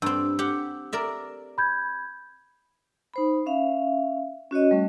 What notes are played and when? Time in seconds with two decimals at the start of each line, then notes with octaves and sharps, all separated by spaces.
0.02 G2 C4 E6
0.39 G4 F#5
0.93 A#4 D5 E5
1.58 B5 G6 G#6
3.14 D#4 C5 B5
3.46 C#4 E5 F5
4.51 C#4 F#4 C#5 D#5
4.71 G3 A3 C#4